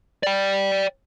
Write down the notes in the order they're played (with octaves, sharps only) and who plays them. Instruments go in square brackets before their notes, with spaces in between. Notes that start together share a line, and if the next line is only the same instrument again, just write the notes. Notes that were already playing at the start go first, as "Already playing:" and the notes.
[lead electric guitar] D5 G5